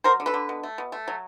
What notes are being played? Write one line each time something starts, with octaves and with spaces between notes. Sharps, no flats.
F#3 A#4 C5
D3
A4 B4
D3
B2
A3
B2
A3
F#3